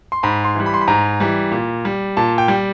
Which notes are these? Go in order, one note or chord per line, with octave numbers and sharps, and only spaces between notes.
C6
G#2 B5
C6
E3 G3
B5
C6
B5
G#2 A#5
E3 G3
A#2
G3
A#2 A5
G5
G3